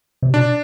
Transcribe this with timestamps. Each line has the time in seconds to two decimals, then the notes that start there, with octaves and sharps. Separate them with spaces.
0.22 C3
0.33 B2 D4